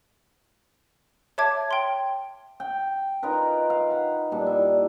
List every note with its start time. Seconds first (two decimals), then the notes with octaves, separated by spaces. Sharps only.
1.38 C#5 E5 A5 D6 G#6
1.71 G5 C6
2.60 G5
3.23 D#4 F4 A#4 B4
3.70 F5
3.91 F#5 B5
4.32 A#2 G3 D4
4.47 E4